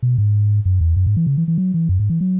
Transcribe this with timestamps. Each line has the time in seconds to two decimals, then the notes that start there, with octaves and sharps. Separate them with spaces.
0.03 B2
0.18 G#2
0.65 F#2
0.81 E2
0.96 F#2
1.06 G#2
1.16 E3
1.27 C#3
1.37 E3
1.48 E3
1.58 F#3
1.74 E3
1.89 F#2
1.99 G#2
2.09 E3
2.21 F#3